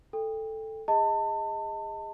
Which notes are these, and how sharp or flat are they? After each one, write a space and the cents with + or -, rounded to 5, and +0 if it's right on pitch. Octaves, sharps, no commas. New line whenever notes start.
A4 +0 G5 +25
G#4 -30 D#5 +20 A5 +30